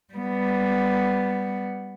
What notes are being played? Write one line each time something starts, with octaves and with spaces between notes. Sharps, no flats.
G3 B3